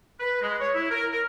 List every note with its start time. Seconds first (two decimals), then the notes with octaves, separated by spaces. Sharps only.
0.20 B4
0.41 G#3
0.60 C#5
0.74 E4
0.91 A#4
1.12 A#4